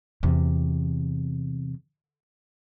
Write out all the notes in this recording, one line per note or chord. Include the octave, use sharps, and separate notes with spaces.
E2 C3